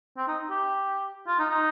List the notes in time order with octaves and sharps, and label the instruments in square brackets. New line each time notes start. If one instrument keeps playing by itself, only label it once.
[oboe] C4
D#4
G4
F4
D#4
D#4